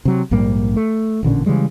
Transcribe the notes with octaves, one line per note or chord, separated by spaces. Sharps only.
C3 F#3
A#1 G#2 G3 A#3
A3
A1 A#2 D3 C#4
C#3 E3 G3 G#3